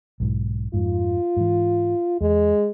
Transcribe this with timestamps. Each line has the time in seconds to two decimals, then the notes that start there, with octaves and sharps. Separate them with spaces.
0.20 B1 G#2
0.73 F2 G#2 F4
1.37 G#2 E3
2.21 E2 G#3